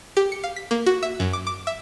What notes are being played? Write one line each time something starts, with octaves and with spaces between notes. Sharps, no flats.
G4
C#7
F5
B6
A#3
F#4
E5
F#2
D6
D6
E5